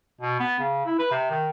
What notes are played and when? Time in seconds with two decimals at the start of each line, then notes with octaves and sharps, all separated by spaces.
0.21 B2
0.40 B3
0.59 C#3
0.86 E4
0.99 B4
1.11 C3
1.30 D#3